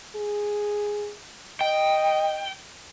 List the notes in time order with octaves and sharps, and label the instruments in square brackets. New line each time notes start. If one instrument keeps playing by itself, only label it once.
[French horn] G#4
[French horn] D#5 [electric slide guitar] G5